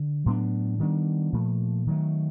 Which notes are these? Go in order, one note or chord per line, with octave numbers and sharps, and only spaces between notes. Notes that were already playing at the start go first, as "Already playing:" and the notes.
Already playing: D3
A2 F#3 B3 D4
D#3 G3 B3 D4
A#2 F3 A3
D#3 F#3 A3